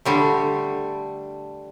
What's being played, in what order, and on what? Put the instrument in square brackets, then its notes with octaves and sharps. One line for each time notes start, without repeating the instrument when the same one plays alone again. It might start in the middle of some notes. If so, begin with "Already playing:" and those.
[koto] D3 G3 A3